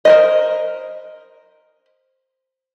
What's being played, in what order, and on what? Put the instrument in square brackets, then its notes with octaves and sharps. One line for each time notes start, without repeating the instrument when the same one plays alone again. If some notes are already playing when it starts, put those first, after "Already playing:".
[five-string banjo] A#4 C5 D#5